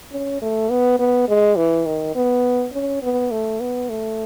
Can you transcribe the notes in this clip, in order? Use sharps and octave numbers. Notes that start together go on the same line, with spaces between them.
C#4
A3
B3
B3
G#3
E3
D#3
B3
C#4
B3
A3
B3
A3